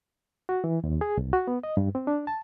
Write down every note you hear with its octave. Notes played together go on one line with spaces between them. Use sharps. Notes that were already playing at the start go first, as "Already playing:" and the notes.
F#4
E3
D#2
G#4
C2
F#4
B3
D#5
G2
C4
D4
A5